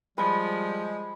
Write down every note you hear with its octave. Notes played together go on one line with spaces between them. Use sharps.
F3 G3 G#3 B5